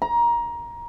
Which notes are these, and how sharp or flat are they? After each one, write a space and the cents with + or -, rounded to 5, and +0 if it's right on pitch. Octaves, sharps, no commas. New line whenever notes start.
A#5 +20